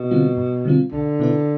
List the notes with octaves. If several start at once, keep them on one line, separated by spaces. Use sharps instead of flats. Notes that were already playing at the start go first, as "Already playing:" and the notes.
Already playing: B2
D3 G3 C4 F4
G2
D3 G3 C4 F4
B1 D3
B2 B3 E4 B4